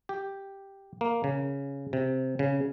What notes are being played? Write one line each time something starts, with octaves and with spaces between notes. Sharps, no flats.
G4
A#3
C#3
C3
C#3